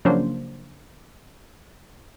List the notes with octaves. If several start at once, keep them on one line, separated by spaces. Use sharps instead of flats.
C#3 F3 F#3 A#3 D4 C5